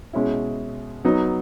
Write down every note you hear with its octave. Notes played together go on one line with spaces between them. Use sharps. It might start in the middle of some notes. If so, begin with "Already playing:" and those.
B2 G#3 C#4 E4
F#3 B3 D#4